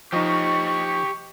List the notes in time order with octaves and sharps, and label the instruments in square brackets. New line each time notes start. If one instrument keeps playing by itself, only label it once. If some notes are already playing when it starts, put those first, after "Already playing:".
[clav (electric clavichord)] F3 D#4 [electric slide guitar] G4 D#5 [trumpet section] C#6